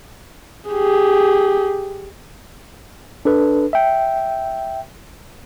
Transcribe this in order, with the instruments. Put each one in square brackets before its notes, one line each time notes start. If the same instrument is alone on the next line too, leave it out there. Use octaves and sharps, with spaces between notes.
[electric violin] G4 G#4
[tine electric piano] D4 A4 B4
E5 G5